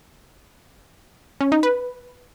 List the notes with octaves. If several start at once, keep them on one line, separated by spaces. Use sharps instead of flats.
C#4
D#4
B4